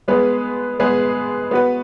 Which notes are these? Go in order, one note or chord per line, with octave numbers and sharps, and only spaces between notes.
G#3 B3 G#4 B4
G#3 B3 G#4 B4
B3 F#4 B4